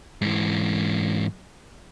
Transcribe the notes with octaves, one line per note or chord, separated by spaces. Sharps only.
G#2 E3